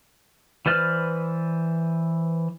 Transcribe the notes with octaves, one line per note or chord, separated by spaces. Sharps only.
E3 B4 C5 D5 F6